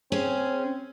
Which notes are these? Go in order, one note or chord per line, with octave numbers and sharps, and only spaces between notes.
C4 C#4 G#4